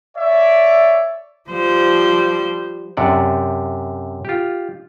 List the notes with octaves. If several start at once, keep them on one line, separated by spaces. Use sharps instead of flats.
C#5 D5 E5
F3 G3 C5
F#2 C3 D5 F#5
F4 G4